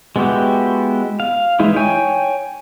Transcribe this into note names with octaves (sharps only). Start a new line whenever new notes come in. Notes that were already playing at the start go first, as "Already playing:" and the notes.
G#3 B3 E4 F#4 G4
F5
E3 G#3 D#4 E4
C#5 G5 G#5 G6